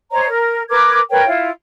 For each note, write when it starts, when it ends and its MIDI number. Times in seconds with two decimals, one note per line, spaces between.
0.11 0.26 72
0.11 0.26 73
0.11 0.26 75
0.11 0.26 82
0.27 0.60 70
0.70 0.99 70
0.70 0.99 71
0.70 0.99 86
0.70 0.99 92
1.10 1.25 70
1.10 1.25 71
1.10 1.25 73
1.10 1.25 79
1.26 1.49 64
1.26 1.49 65